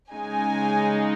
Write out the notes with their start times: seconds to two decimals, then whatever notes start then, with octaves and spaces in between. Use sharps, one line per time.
0.12 C#3 G#3 D#4 G#5